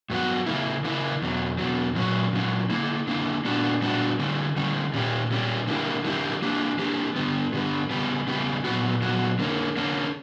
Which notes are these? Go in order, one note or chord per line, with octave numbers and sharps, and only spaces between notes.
G2 F#3 B3 F#4
C#3 E3 A#3 E4
C#3 E3 A#3 E4
E2 B2 F#3
E2 B2 F#3
A#2 F#3 C#4
A#2 F#3 C#4
D3 A#3 E4
D3 A#3 E4
A#2 G3 B3 D4 F#4
A#2 G3 B3 D4 F#4
D3 G3 C#4
D3 G3 C#4
A#2 G3 C#4 G4
A#2 G3 C#4 G4
D3 G3 A#3 E4 G4
D3 G3 A#3 E4 G4
E3 A#3 D4 G4
E3 A#3 D4 G4
G2 D3 G3 B3
G2 D3 G3 B3
C#3 G3 B3
C#3 G3 B3
A#2 F#3 B3 F#4
A#2 F#3 B3 F#4
D3 A#3 C#4
D3 A#3 C#4